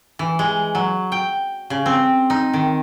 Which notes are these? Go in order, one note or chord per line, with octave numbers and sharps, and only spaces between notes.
E3
G#3
F#3
G5
C#3
C4
D#4
D#3